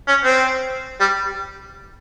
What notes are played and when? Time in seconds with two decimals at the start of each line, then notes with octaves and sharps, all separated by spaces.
0.08 C#4
0.24 C4
1.01 G3